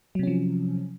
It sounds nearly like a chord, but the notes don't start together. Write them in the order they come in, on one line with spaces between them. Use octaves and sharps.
F#3 C3 C#4 F3